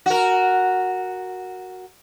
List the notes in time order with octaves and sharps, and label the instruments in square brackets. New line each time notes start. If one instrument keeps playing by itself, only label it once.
[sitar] F#4 A#4